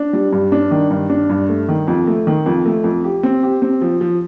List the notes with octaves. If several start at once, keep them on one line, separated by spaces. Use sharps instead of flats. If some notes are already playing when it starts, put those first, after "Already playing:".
Already playing: D4
G3
G2
D4
D#3
G2
D4
G2
A3
D#3
F2
A3
D#3
F2
A3
F2
G4
C4
G4
C4
F3
F3